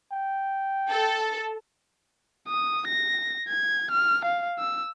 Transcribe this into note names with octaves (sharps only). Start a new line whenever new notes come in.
G5
A4
D#6
A#6
G#6
F6
F5
E6